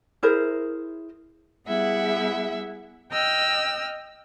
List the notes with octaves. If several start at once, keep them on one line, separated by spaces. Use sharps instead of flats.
E4 G#4 A#4 C5
G3 B3 E4 G#4 E5 F#5
D#5 G5 E6 F6